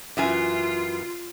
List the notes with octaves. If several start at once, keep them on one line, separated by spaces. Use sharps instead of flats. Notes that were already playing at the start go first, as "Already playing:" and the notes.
F#2 E3 F4 G#5